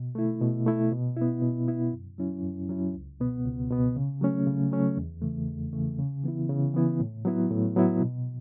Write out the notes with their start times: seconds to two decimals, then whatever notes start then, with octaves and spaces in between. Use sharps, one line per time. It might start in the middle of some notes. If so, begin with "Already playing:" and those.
Already playing: B2
0.15 A3 E4
0.41 B2
0.66 A3 E4
0.92 B2
1.17 B3 E4
1.42 B2
1.68 B3 E4
1.92 F#2
2.18 F#3 C#4 E4
2.43 F#2
2.69 F#3 C#4 E4
2.94 C#2
3.20 B2 B3
3.45 C#2
3.71 B2 B3
3.96 C#3
4.21 F#3 A3 C#4
4.47 C#3
4.71 F#3 A3 C#4
4.97 E2
5.22 C#3 E3 A3
5.48 E2
5.73 C#3 E3 A3
5.99 C#3
6.23 E3 B3 E4
6.49 C#3
6.74 E3 B3 E4
7.00 A2
7.25 F#3 B3 E4
7.50 A2
7.76 F#3 B3 E4
8.01 B2